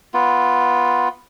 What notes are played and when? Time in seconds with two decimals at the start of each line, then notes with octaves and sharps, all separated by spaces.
0.14 B3 F4